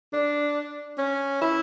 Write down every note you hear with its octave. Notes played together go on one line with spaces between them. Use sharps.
D4
C#4
E4